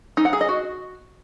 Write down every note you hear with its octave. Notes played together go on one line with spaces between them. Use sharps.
D#4
F#5
G#4
D#5
F#4